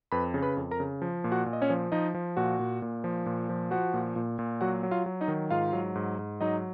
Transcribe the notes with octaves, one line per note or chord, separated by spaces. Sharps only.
F2 B4 B5
C#3
B4 B5
F2
A#4 A#5
C#3
F3
A#2
F#4 F#5
A#2
D#5
C#4 C#5
F3
F3 D#4 D#5
F3
A#2 F#4 F#5
A#2
A#2
F3
A#2
F3
F3 F#4 F#5
A#2
A#2
A#2
F#3 F#4 F#5
F#3
F4 F5
F#3
D#4 D#5
D#3
G#2 F4 F5
F#3
G#2
G#2
F#3 D#4 D#5